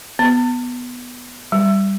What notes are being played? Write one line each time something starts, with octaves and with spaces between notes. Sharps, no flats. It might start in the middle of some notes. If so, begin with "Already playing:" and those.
B3
G3